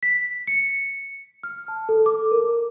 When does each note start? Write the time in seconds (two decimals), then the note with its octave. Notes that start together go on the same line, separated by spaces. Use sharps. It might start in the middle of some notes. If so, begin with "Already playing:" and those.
0.03 B6
0.47 C#7
1.43 F6
1.68 A5
1.89 A4
2.06 D6
2.31 A#4